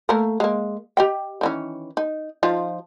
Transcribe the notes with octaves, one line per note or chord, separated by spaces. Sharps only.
A3 A#3 A#4
G#3 A#3
G4 D#5 G5
D#3 E3 C#4
D#4
F3 D#4 F4